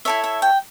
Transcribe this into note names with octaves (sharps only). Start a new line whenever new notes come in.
E4 A4 C#5 E5
E5
G5